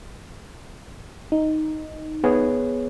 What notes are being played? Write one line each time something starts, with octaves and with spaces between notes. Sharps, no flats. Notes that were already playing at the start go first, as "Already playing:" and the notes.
D#4
B3 G#4 C#5